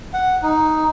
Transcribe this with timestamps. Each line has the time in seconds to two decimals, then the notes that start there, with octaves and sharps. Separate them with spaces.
0.14 F#5
0.43 D#4